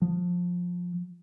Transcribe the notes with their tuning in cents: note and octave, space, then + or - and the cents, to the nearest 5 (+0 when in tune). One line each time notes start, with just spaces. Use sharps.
F3 +20